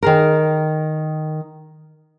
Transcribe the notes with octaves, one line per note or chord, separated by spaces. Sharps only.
D#3 G#4 A#4